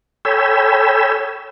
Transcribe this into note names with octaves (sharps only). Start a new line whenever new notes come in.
A4 C#5 G5 G#5 B5 E6